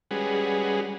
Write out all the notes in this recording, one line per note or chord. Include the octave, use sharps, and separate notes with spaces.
G3 G#3 C#4 F#4 G#4 B4